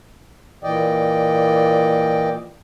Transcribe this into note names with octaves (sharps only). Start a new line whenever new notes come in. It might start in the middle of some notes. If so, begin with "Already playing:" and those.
A#2 E3 D5 D#5 G5